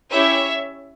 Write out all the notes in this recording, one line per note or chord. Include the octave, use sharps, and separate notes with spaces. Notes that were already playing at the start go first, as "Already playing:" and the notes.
C#4 E4 G4 C#5 E5